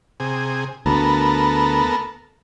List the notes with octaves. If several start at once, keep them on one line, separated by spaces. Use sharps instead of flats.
C3 G#4
D2 B3 A4 A#4